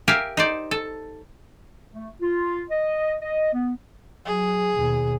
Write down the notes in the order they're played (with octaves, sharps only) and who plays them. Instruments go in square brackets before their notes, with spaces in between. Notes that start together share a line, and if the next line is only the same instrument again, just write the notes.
[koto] G4 A#4 E5 F5 G#5
D#4 C5 D5
A4
[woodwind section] A3
F4
D#5
D#5
B3
[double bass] F#3 [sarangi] G#4
[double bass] D#2 B2